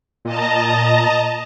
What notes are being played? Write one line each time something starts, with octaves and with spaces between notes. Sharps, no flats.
A#2 D#5 A5 A#5